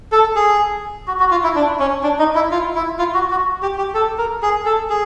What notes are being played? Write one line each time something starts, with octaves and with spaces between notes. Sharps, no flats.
A4
G#4
F#4
F#4
F4
E4
D4
C#4
D4
D#4
E4
F4
E4
F4
F#4
F#4
G4
G4
A4
A#4
G#4
A4
G#4